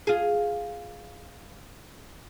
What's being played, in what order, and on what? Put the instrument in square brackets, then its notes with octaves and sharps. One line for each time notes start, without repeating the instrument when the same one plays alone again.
[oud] F4 G#4